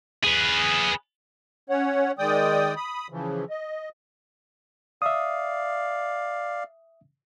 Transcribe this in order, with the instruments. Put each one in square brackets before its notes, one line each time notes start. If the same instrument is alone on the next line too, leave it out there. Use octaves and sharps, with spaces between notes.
[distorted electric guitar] G#4 B4
[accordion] C#4 C#5 F#5
D#3 G#3 D5 G5 D#6
B5 D#6
C#3 E3 F3
D#5
[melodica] D5 F5 [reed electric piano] E5 D#6